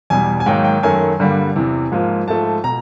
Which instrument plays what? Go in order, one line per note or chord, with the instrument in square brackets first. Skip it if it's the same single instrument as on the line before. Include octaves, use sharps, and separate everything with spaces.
[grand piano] E2 B2 G3 G#5
G#5
G#2 D#3 F#3 A#3 G5
G5
F#2 D#3 F#3 A3 G#5
G2 D3 G3 A#3
E2 C3 E3
G#2 F3 A#3
G#2 F3 A3 A5
B2 A#5